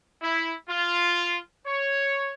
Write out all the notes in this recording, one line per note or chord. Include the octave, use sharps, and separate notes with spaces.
E4
F4
C#5